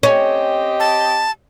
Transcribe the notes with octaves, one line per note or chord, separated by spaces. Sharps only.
C4 C#4 G4 D#5
A5